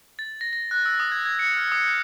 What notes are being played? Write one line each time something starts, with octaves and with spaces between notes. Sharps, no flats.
A6
A#6
A#6
F#6
E6
D#6
G#6
G#6
C#7
F6
D#6
G6